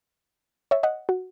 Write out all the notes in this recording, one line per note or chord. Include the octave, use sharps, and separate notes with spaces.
C#5 E5
D#5 F#5
F#4